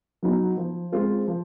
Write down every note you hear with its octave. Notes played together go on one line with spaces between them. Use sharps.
F#3 B3 D#4
F3
G#3 C4 F4
F3